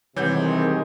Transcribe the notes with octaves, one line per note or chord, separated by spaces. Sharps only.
C3 D#3 E3 G3 G#3 C#5 F#5 G6